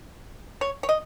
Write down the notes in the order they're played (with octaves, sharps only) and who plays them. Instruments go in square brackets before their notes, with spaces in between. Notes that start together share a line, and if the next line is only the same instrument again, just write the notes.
[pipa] C#5
C#5
D#5